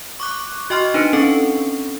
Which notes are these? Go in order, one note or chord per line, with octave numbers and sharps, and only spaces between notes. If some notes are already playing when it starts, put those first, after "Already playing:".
C#6 D6 F#6
F#4 D#5 G5 C6 C#6 F6
D4 D#4 B4 C#7
C4 C#4 A4 C#6